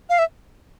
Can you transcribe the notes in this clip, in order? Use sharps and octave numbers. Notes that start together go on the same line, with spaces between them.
F5
E5